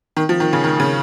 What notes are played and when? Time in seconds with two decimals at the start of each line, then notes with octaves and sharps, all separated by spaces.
0.17 D#3
0.29 F3
0.40 D#3
0.53 C#3
0.64 D#3
0.80 C#3